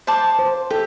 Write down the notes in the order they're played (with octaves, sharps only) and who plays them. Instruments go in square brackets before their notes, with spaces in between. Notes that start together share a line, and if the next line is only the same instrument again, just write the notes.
[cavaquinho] C5 A5 D6
[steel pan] C5
[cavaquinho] G4 [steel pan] A4